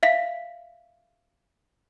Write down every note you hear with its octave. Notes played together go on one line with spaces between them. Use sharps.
E5 F5 B6